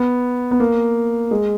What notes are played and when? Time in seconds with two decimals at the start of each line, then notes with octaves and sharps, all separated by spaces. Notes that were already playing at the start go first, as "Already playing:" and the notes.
Already playing: B3
0.51 B3
0.60 A#3
1.31 G#3